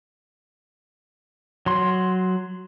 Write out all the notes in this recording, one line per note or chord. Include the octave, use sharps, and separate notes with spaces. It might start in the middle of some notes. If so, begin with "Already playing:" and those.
F#3 C6